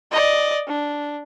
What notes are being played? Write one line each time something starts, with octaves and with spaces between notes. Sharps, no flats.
D5 D#5
D4